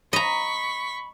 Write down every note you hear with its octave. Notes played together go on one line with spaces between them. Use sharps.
D#5 A#5 B5 C#6 B6